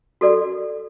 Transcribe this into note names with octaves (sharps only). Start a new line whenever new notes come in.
F#4 A4 D5